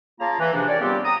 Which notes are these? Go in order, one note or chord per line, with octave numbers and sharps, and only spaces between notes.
C#3 A#3 F4 A5 A#5
E3
G#2 C3 F3 D4
G4 A#4 C#5 D5
C#3 G3 B3 C4 F4 G4
G5 A#5 D#6